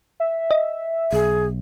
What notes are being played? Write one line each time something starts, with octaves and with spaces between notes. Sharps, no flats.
E5
D#5
B1 G#4